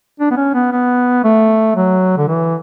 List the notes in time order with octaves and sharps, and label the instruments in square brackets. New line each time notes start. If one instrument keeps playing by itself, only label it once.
[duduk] D4
B3
C#4
B3
B3
A3
F#3
D3
E3